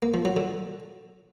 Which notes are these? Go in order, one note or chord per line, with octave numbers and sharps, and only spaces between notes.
A#3
F3
F#3
D3